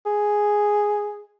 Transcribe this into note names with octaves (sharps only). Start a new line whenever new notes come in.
G#4